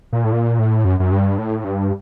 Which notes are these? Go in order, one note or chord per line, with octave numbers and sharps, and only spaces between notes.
A#2
A2
A#2
A2
F#2
F#2
G2
A2
G2